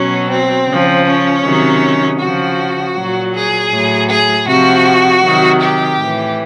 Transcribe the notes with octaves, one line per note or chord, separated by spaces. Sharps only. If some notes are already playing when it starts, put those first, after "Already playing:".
Already playing: B2 F#3 C#4
C4
C#3 F3
C#4
C3 D#3 F#3
C#3 F3 F#4
A#2 F#3
G#4
A2 F#3
G#4
C3 F3 F#4
C3 D#3 F#3
G4
A2 E3